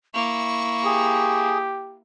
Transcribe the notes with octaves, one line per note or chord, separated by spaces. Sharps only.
A#3 E4 C#6
G4 G#4